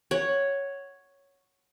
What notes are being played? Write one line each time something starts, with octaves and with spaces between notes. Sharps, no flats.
C#5 F#5